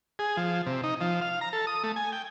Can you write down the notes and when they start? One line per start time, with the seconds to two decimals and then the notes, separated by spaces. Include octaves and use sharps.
0.19 G#4
0.37 F3
0.66 C3
0.83 D#4
1.01 F3
1.21 F5
1.41 A#5
1.53 A4
1.67 D#6
1.84 A3
1.96 G#5
2.12 G5